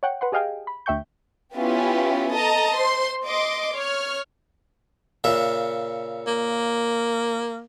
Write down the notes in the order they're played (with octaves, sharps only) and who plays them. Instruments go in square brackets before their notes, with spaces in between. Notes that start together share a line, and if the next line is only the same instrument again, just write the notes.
[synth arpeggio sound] C#5 F#5 G5
B4 F#5 C6
G4 G#4 D#5 F5 G5 G#5
B5
D2 E5 G5 C#6 G6
[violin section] B3 C#4 E4 F4 G4
A4 D#5 A5 A#5
C5 C6
D#5 C6 D6
C#5 F6
[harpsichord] A#2 C#3 E5
[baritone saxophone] A#3